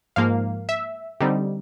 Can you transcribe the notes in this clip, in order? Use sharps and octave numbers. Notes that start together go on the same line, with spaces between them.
G#2 F3 A#3 F5
E5
D3 G3 C4 D#4